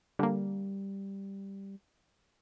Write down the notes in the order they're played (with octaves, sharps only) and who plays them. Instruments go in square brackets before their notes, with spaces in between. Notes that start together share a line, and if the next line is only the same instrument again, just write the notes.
[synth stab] D3 A#3 [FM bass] G3